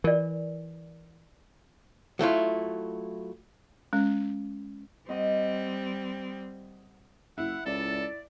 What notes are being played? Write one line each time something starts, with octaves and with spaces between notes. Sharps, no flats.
E3 A#4 D5
F#3 A3 E4 F4
G#3 C#4
G3 C4 D#5 F#5 D#6
F#1 E4 F#5
C#2 A4 D5